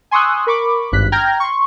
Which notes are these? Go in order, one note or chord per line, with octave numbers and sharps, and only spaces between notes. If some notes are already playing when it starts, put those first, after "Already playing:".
G#5 C6 C#6 D#6 E6 F#6
A#4 B5 C#6 D6
G#1 G2 F#6 B6
G5 A#5 F6 G6 G#6 A#6
C6 C#6